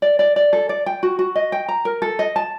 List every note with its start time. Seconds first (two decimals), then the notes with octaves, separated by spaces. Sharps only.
0.02 D5
0.19 D5
0.36 D5
0.53 A4
0.69 D5
0.86 G5
1.03 F#4
1.19 F#4
1.35 D#5
1.52 G5
1.68 A#5
1.85 A#4
2.02 A4
2.19 D#5
2.36 A5